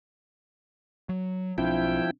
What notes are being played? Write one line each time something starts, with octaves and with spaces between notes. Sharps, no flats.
F#3
B1 F3 C4 D4 E4 G5